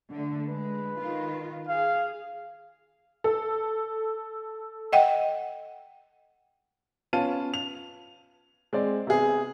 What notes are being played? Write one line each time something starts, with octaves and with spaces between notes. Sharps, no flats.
D3 A3
G#3 B4
D#3 F4
G#4 F5
A4
D#5 F#5 G5
B3 C#4 F4 A5 D#7
F7
G#3 C4 D5
C3 B3 G#4